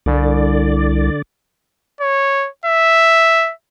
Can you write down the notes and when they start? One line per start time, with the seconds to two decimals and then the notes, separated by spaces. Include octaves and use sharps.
0.06 C2 D3 D5
2.01 C#5
2.66 E5